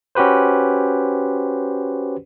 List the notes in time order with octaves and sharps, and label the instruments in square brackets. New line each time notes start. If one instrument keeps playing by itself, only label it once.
[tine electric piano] C#4 F#4 G4 B4 C5